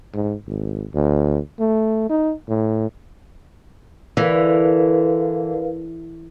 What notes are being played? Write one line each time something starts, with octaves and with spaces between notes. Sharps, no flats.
G#2
G#1
D2
A3
D#4
A2
D3 E3 A#4 B4 F5